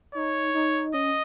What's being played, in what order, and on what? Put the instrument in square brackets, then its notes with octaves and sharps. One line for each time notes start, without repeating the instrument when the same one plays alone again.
[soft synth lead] D#4 [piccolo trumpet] C#5
[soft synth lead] D#4
[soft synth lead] C#4 [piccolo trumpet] D#5